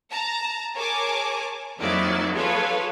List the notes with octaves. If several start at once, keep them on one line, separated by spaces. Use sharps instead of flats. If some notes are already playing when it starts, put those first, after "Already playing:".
A5 A#5
G#4 A#4 C#5 G#5 A5 D6
F2 D#3 F#3 A#3 E4 D5
F4 G#4 A4 B4 C#5 F5